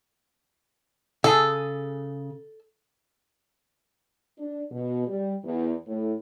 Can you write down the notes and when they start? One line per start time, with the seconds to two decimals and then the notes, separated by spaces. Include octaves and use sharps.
1.24 C#3 G#4 A4
4.39 D4
4.72 B2
5.07 G3
5.44 E2
5.87 A2